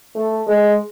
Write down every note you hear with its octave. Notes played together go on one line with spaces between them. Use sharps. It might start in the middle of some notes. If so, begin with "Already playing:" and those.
A3
G#3